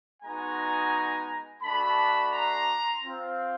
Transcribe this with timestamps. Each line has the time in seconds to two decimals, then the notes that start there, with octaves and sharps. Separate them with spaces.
0.23 G#3 B3 D#4 F#4 G#5 A#5
1.62 A3 D4 F#4 A5 B5
2.32 A#5 C6
3.03 C4 F4